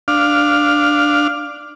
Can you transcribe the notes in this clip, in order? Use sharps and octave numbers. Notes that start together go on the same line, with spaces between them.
D4 F5